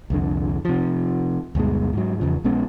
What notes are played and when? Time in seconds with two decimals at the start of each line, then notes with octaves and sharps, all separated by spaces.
0.10 C2 F2 D3
0.65 C3 F3
1.55 D2 G2 B2 G#3
1.93 G#2 F#3
2.20 E2 C#3 F3
2.44 A#1 G#3 B3 C#4